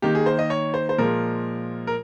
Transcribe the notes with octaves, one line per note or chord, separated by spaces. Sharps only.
D#3 A#3 G4
G#4
C5
D#5
C#5
C5
C5
A#2 F3 G#3 A#4
A#4